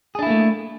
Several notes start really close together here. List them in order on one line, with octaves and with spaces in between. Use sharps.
G#4 D4 E4 A#3 A3